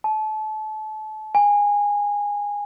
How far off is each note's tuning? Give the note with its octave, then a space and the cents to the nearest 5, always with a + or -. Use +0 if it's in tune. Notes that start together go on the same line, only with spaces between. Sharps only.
A5 -30
G#5 -20